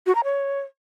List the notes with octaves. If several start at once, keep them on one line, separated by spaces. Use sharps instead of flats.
F#4
A#5
C#5